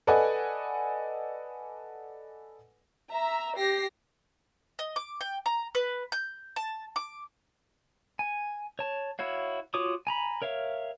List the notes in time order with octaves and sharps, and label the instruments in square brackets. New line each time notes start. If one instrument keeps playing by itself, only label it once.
[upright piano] A4 B4 D5 D#5 F#5 G#5
[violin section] E5 A#5
G4 A#6 C7
[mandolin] D#5
D6
G5
A#5
B4
G6
A5
D6
[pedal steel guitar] G#5
C#5 A5
E4 F#4 C#5 F5
F4 F#4 C#5 D6 D#6
G#5 A#5 B5
A#4 C#5 E5 F5